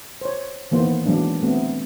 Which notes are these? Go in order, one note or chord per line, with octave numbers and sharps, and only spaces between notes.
C5 C#5
D#3 E3 A#3 B3 C5
E3 F#3 G#3 B3 D4
A3 B3 C4